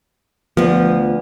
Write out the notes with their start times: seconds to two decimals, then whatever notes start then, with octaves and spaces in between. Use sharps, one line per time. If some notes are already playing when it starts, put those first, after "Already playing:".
0.57 D2 F3 B3